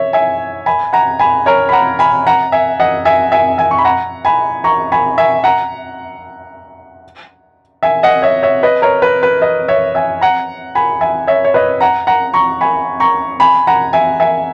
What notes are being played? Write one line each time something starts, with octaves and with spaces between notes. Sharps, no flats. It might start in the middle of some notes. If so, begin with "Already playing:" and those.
Already playing: C#5 E5
E5 G#5
G#5 B5
F#5 A#5
G#5 B5
A#4 C#5
B5
F#5 A#5
G#5 B5
F#5 A#5
E5 G#5
D#5 F#5
E5 G#5
E5 G#5
E5 G#5
C#6
B5
F#5 A#5
G#5 B5
A#5 C#6
G#5 B5
E5 G#5
F#5 A#5
E5 G#5
D#5 F#5
C#5 E5
C#5 E5
B4 D#5
A#4 C#5
B4
B4
B4 D#5
C#5 E5
E5 G#5
F#5 A#5
G#5 B5
E5 G#5
C#5 E5
C#5
B4 D#5
F#5 A#5
F#5 A#5
A#5 C#6
G#5 B5
A#5 C#6
G#5 B5
F#5 A#5
E5 G#5
E5 G#5